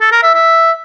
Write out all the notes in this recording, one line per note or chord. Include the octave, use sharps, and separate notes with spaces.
A4
A#4
E5
E5